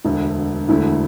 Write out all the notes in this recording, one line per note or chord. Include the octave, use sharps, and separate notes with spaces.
E1 D2 D3
E1 D2 D3 A3 E4